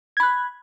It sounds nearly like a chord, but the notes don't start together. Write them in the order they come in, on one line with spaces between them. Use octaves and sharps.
G#6 B5 F#6